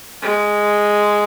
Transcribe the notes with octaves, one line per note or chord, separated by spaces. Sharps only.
G#3